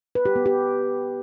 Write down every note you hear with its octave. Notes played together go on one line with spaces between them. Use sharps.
B4
G4
B3
G4